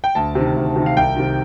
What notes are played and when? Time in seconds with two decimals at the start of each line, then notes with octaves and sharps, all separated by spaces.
0.04 G5
0.15 D2 A5
0.35 C3 D#3
0.56 D2
0.76 C3 D#3
0.86 F5
0.96 C2 G5
1.16 C3 D#3